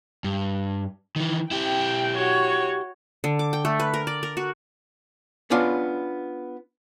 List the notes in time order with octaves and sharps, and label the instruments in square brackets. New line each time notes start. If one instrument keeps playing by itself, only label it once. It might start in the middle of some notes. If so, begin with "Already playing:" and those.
[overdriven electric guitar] G2
D#3 E3
[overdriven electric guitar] E4 G4 [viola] G5
[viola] F#4 C#5
[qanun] D3
D6
G5
A3
B4
A#4
D5
A#4
F#4
[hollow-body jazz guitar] B3 C#4 D4 F4